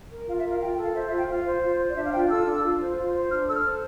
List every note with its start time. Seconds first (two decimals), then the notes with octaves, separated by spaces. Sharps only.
0.11 A#4
0.28 F4 F5
0.39 E5
0.44 A#4
0.50 F5
0.61 F4 G5
0.72 G5
0.78 A4
0.84 F5
0.95 C5 E5
1.06 E5
1.11 F4
1.17 G5
1.28 F4 F5
1.45 C5
1.62 F4
1.79 C5
1.88 D5
1.96 D4 E5
2.04 F5
2.13 F4 G5
2.29 A4 E6
2.47 D4
2.63 F4
2.81 C5
2.96 F4
3.14 C5
3.31 D4 F6
3.47 A4 E6
3.54 F6
3.65 C5